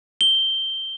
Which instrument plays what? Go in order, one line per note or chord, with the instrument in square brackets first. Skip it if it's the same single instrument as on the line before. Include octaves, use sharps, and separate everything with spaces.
[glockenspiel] G7